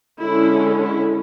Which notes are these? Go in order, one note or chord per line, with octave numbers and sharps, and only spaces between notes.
D3 G#3 C#4 E4
E4